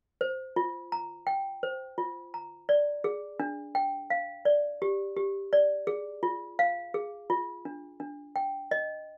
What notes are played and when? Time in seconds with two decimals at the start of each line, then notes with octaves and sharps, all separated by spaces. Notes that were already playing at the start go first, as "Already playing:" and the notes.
0.21 C5
0.56 F4
0.92 A#5
1.27 G5
1.63 C5
1.98 F4
2.34 A#5
2.69 D5
3.04 G#4
3.40 D4
3.75 G5
4.10 F5
4.45 D5
4.82 G4
5.16 G4
5.53 D5
5.87 G#4
6.23 F4
6.59 F5
6.94 G#4
7.30 F4
7.65 D4
8.00 D4
8.36 G5
8.71 D#5